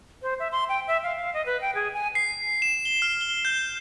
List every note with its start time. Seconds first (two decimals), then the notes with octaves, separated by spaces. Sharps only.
0.22 C5
0.40 E5
0.52 C6
0.69 G5
0.87 E5
1.04 F5
1.16 F5
1.34 D#5
1.46 B4
1.61 G5
1.75 G#4
1.94 G#5
2.15 C7
2.62 E7
2.85 G7
3.02 F6
3.21 G7
3.45 G6